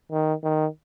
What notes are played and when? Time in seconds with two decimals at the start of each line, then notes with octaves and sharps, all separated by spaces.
0.11 D#3
0.44 D#3